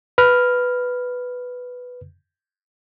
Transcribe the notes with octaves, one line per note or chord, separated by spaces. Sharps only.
B4 F6